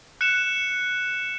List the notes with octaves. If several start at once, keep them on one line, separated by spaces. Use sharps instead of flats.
F#6 C#7 E7